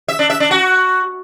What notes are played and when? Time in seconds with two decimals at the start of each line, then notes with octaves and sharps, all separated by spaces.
0.08 E5
0.19 D4
0.30 E5
0.40 D4
0.51 F#4